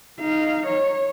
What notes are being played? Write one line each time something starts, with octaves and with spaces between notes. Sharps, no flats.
D#4 F5
C#5